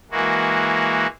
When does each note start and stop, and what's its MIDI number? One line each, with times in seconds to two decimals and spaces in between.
0.11 1.06 52
0.11 1.06 56
0.11 1.06 58
0.11 1.06 66